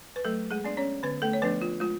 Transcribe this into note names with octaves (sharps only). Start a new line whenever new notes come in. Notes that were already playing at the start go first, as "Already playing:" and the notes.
B4
F#3 A3 A4
G#3 G#4
B3 D4 D5
C#4 C#5
D3 B3 B4
A3 A4
C#5
F3 A3 B3 D4 B4
F4
G#3 F4